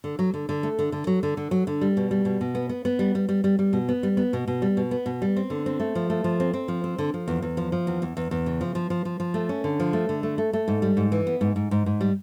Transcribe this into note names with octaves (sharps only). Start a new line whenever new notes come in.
D3
F#3
D3
D3
A3
D3
D3
F#3
D3
D3
F#3
D3
G3
B2
G3
B2
B2
B3
B3
B3
G3
G3
G3
G3
G3
B2
B3
G3
B3
B2
B2
G3
B2
B3
B2
G3
C4
D3
C4
A3
F3
A3
F3
C4
C4
F3
C4
D3
F3
E2
E2
F3
F3
E2
E2
E2
E2
C#3
F3
F3
F3
F3
F3
A3
C#4
D3
F3
A3
D3
A3
A3
A3
G#2
G3
G#2
E3
B3
G#2
G#2
G#2
G#2
G3